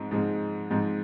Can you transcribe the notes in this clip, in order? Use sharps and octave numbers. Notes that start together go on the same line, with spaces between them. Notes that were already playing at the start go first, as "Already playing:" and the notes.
Already playing: G#2 F3 G#3 C4
G#2 F3 G#3 C4
G#2 F3 G#3 C4